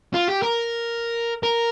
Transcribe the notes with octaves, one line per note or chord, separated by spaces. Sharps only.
F4
G4
A#4
A#4